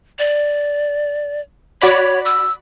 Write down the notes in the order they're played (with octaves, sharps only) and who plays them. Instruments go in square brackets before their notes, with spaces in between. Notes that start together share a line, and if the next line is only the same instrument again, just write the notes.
[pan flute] D5
[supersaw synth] F#4 D5 B5 [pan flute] C#5
[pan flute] E6